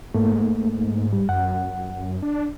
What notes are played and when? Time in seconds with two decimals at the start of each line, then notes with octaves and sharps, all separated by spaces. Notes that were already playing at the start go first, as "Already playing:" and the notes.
0.14 G#2 A3 A#3
1.13 G3
1.29 F#2 F#5
2.22 D4